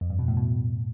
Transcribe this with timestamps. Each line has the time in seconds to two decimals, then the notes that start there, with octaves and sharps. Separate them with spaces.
0.01 F2
0.10 G2
0.19 B2
0.28 A2
0.37 B2